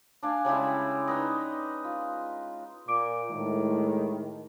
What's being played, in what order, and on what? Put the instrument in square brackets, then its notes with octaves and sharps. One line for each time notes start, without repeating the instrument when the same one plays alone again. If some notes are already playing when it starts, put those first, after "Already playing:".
[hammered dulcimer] D4 F5 G#5
C#3 G3 G#3 E4
D#4 B4 D#5
F4
[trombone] A#2 [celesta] D6 D7
[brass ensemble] A2 G#3 [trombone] D#3